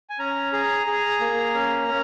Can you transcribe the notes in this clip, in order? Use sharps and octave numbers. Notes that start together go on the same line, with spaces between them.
G#5
C#4 A#5
G#4 A#5
G#4
A#3
C#4
C#4